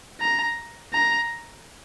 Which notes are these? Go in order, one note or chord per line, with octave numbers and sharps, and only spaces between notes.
A#5
A#5